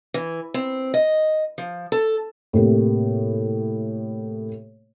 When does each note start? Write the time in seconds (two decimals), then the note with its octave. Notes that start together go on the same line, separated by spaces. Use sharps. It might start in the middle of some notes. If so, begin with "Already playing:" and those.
0.14 E3
0.54 C4
0.94 D#5
1.58 F3
1.92 A4
2.53 A2 C3 A#3 G4